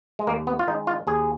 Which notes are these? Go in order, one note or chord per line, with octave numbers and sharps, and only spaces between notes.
G#3
D#2 A#3
B3
F4
D#3 G#3 D#4
F4
D#2 G#4